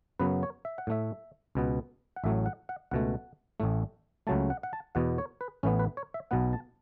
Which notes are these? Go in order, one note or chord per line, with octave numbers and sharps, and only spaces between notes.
F#2 C#3 F#3 B3 B4
C#5
E5
F#5
A2 A3 E5
C#2 B2 B3
F#5
A1 A2 F#3 A3 E5
F#5
F#5
C#2 B2 A3 F#5
A1 A2 A3
C#2 C#3 F#3 A3 A5
F#5
F#5
A5
E2 B2 B3 F#5
C#5
B4
A1 A2 E3 B3 C#4
B4
C#5
E5
B1 B2 B3 F#5
A5